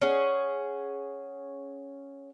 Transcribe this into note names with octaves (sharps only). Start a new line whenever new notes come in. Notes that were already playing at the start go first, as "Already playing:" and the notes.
C#4 G#4 F#5